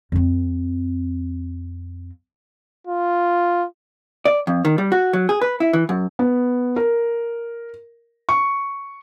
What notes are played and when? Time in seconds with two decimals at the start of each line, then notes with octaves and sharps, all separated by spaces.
0.12 F2 C4
2.87 F4
4.25 D5
4.47 F2
4.65 D#3
4.78 G3
4.92 F#4
5.13 F#3
5.29 G#4
5.41 B4
5.60 E4
5.73 E3
5.89 F#2
6.19 B3
6.76 A#4
8.29 C#6